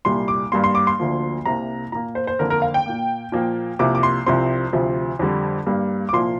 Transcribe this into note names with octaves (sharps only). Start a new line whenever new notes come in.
C2 A#2 G3 C6
D6
G2 G3 A#3 C6
C6
D6
C6
D2 D3 F3 A#3
C2 C3 A#3 A#5
A#2 A#3 A#5
C5
C5
F2 D3 A#3 A#4
A#4
F5
G5
A#2 A#3
A#2 F3 A#3
C2 C3 F3 A#3 D6
D6
C6
C2 C3 F3 C4 C6
D2 C3 F3
F2 D3 G3
G2 G3 A#3
D6
C2 A#2 F3 A#3 C6